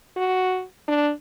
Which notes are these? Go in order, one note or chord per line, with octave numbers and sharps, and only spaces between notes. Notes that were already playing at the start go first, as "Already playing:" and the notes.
F#4
D4